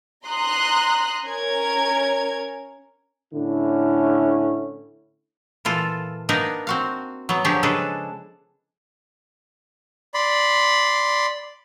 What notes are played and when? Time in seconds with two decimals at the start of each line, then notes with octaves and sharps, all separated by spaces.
0.27 A#5 C6 D#6 F#6
1.25 C#4 A#4 G#6
3.34 A2 D3 C#4 E4
5.65 A#2 E3 F4 A4
6.29 A#3 B3 D4 D#4 A#4 B4
6.67 C4 F#4 F5
7.29 F#3 B3
7.45 D3 F3 F#3 G4 G#4 C#5
7.63 C#3 G#3 D4 G#4 A4 B4
10.14 D5 B5 C6